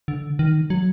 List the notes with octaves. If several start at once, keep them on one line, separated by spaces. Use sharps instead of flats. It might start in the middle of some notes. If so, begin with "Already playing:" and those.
D3
D#3
F#3